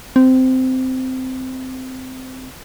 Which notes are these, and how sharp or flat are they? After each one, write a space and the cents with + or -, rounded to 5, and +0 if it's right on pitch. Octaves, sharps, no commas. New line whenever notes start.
C4 -15